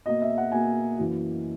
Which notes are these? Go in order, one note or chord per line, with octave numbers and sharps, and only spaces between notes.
B2 A#3 D#5
E5
F#5
B2 A#3 G#5
F#2 E3 A#3